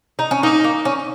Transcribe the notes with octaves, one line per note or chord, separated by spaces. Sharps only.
D#4
C#4
A#3 D#4
A#3
C#4